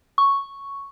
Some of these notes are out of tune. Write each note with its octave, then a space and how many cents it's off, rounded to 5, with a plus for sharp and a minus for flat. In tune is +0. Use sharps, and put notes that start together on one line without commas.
C#6 +0